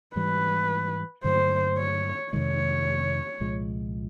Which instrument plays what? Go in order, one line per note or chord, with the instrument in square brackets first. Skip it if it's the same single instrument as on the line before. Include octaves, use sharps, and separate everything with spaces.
[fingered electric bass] G#2 E3 G3 [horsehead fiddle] B4
[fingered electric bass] G2 D3 F#3 A3 [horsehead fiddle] C5
[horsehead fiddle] C#5
[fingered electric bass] F2 C3 D#3 G#3 [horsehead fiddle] C#5
[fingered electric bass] C2 A#2 F3 G#3